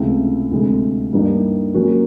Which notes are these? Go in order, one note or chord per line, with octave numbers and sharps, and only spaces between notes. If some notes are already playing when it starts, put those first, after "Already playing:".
Already playing: C#2 C3 E3 A3
D2 C3 E3 G#3
G2 E3 G3 A#3 D#4
F#3 A#3 C#4 F#4